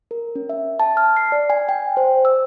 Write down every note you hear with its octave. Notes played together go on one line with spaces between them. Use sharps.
A#4
C#4
E5
A5
F6
C7
D5
G#5
G5
C5
E6